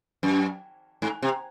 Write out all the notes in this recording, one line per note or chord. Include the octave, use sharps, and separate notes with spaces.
F#2
G#2
C3